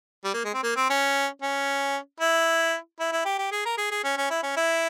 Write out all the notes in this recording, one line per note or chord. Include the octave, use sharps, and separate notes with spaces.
G3
A#3
G#3
C4
A#3
C4
C#4
C#4
E4
E4
E4
G4
G4
G#4
A#4
G#4
G#4
C#4
C#4
E4
C#4
E4